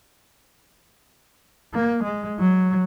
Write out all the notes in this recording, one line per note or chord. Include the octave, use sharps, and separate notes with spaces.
A#3
G#3
F#3